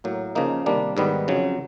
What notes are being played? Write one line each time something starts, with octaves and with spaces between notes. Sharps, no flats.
A2 F#3 A#3
C#3 F3 A#3 D#4
C3 D#3 G3 A#3 D4
G#2 D#3 G3 B3
F2 C#3 F#3